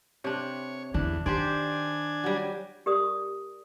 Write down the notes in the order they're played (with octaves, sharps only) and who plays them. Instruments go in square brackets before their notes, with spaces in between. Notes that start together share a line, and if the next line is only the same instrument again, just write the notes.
[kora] C3 D4 [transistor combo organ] C#5
[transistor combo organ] E2 [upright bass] D3 [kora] D4
[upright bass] D#3 [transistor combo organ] D4 G#5 [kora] G4 C5 D5
[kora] F#3 G3
[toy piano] G4 A#4 D5 D#6